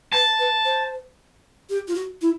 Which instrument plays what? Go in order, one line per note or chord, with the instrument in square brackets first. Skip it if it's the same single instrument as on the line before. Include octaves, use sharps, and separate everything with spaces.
[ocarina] B4 [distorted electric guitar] A5
[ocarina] B4
C5
G4
F4
F#4
E4